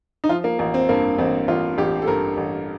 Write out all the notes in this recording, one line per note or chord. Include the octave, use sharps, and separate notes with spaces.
D#4
F3 F4
A#3
A1 A#3
C4
G2 A#3
A1 C4
A1 F4
A1 G4
A4
G2 A#4
A1